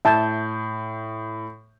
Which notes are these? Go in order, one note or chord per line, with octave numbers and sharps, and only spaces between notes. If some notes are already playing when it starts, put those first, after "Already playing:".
A2 E5 A5 G6